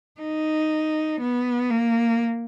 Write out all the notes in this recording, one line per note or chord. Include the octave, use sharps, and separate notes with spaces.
D#4
B3
A#3